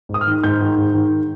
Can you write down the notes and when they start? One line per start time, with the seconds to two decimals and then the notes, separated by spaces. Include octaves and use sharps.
0.09 G#2
0.14 D#6
0.21 F6
0.27 D#3
0.44 G#2 G6
0.61 D#3
0.78 G#2
0.94 D#3